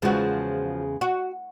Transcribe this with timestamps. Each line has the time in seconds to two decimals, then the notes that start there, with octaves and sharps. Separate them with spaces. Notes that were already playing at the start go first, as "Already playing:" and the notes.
0.02 E2 C#3 F3 G#3 F#4
1.01 F#4